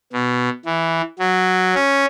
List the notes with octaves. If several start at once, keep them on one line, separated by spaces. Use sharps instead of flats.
B2
E3
F#3
C#4